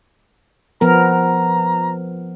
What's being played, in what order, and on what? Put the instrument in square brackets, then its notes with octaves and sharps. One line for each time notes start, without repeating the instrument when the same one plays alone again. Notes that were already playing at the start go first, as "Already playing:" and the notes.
[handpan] F3 B3 A#4 [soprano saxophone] A#5